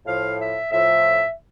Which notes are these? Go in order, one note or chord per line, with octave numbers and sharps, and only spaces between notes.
A2 F3 F5
E5
A2 F3 E5